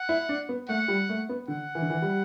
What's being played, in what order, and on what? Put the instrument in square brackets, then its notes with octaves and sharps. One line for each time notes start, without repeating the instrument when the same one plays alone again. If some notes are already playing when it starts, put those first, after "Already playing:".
Already playing: [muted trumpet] F#5
[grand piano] E4
D4
B3
[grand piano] A3 [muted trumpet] F#5
[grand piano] G3
A3
B3
[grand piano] D3 [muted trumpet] F#5
[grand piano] E3
D3
E3
G3